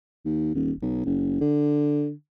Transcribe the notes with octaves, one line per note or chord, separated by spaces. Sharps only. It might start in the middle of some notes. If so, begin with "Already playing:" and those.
D#2
D#1
B1
F#1
D3